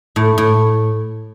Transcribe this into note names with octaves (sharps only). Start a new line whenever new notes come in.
A2
A2